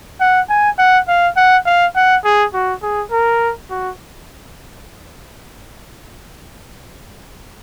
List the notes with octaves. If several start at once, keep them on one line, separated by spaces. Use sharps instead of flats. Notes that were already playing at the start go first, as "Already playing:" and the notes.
F#5
G#5
F#5
F5
F#5
F5
F#5
G#4
F#4
G#4
A#4
F#4